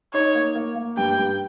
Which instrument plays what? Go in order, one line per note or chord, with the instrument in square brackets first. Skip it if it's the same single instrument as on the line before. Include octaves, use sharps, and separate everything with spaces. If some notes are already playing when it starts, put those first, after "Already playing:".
[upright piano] D#4 [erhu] C#5
[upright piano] A#3
A#3
A#3
[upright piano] G2 [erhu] G5
[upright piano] G2